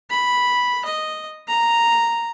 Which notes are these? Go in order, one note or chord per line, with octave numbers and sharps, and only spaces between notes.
B5
D#5
A#5